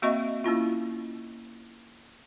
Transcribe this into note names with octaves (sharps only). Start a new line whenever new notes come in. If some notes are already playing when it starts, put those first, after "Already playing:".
A#3 C4 F#4 D#5 E5 C#6
A#3 C#4 E4 F4